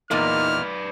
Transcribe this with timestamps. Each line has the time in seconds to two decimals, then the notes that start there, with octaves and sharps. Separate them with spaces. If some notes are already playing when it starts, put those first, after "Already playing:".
0.11 E2 A#2 A#3 D#4 B4 D5 F6